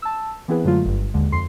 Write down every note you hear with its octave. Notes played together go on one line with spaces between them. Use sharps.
A5 E6
E3 B3 C4 E4 G#4 B4
F#2 D3 F#3 G#3 A3 F4
G1 G2
D#2 D3 G#3
F2 C6 C7